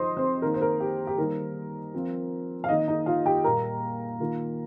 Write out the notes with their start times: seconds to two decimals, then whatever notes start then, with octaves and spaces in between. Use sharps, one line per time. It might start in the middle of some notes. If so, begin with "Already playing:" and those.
Already playing: F3 D#4 C5 D#5 C6 D#6
0.17 C4 C5
0.42 D#3 A#3 D#4 A#4
0.54 C5
0.62 A#4
0.80 G4
1.07 G4
1.17 D#3 G3 A#3 D#4 A#4
1.94 F3 C4 F4
2.64 F5
2.68 D#3 A#3 D#4 D#5
2.88 D#4 D#5
3.06 F4 F5
3.26 G4 G5
3.44 A#2 G3 A#3 A#4 A#5
4.20 D#3 A#3 F4